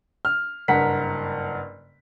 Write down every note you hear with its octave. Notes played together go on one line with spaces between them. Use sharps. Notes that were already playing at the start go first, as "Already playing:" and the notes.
F6
F#1 G2 A#4 F#5 B6